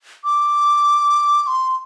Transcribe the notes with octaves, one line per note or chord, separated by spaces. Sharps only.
D6
D6
C6